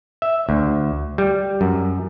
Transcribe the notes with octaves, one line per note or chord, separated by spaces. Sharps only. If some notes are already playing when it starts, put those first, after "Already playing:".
E5
D2
G3
F#2